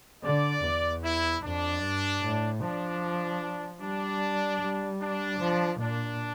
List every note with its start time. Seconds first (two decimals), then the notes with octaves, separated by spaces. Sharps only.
0.23 D3 D5
0.63 E2
1.03 E4
1.42 F2 D4
1.82 G2
2.22 A2
2.61 F3 D4
3.81 G3 D4
4.61 G3
5.00 D4
5.39 F3
5.80 A#2 D4